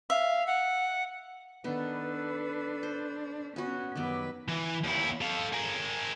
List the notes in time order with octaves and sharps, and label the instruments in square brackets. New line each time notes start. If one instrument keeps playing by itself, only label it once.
[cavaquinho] E5 [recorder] F5
[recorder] F#5
[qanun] D#3 B3 [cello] D4 [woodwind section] A4 B4
[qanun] C5
[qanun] B3 F#4 [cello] C#4
[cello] F#2 B4 [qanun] D#3 G3 B3 [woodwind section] F#3 F#5 D6
[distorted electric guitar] E3
D#2 E4
A4 F5
G#4 A#4